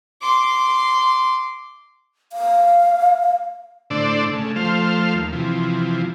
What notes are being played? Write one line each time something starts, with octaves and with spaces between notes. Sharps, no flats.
C6 D6
F5
A2 D3 D4 C5 D5 E6
C#3 A3
F3 A3 C5 F5
D#2
C3 E3 F3